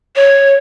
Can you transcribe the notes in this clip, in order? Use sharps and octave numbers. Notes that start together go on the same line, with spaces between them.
C#5